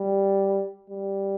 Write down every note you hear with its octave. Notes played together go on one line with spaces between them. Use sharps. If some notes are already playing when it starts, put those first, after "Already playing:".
Already playing: G3
G3